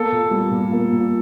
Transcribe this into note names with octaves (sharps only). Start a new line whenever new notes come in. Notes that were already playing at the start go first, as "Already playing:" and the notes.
Already playing: A#3 A4
A#2
G3
A#2
A#3
A#2